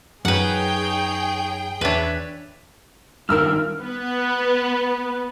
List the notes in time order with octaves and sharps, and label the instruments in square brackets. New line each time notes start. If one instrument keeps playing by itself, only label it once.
[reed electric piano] F#2 [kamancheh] D#4 C#5 [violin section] G#4 G5 [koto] B4 F#5
[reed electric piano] E2 [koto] D4 B4 [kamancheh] C#5 E5
[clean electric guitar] G2 D#3 [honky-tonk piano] A#4 E6 F6
[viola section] B3 B4